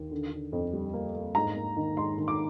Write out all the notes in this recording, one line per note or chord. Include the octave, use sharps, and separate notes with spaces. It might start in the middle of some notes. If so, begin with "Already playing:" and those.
Already playing: D#2
D3
D3
F2
G3
A#3
A#3
G#2 A#5
A#3
D#3
G#2 C6
D#3
D6